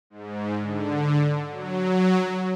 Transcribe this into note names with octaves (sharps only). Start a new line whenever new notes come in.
G#2
D3
F#3